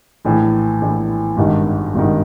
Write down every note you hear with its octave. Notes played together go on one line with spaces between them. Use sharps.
A#1 A2 E3
A#1 A2 E3
G#1 G2 D#3
G#1 G2 D#3